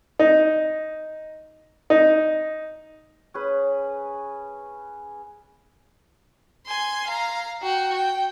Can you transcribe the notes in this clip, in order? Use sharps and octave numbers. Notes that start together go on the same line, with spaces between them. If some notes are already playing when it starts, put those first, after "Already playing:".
D#4
D#4
C#4 G#4 B4
G#5 C6
F5 A#5
F#4 G5
G5